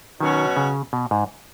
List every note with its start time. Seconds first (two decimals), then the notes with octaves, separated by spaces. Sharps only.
0.20 B2 D#3 F#3 C#4 F#4
0.57 C#3
0.93 B2
1.11 G#2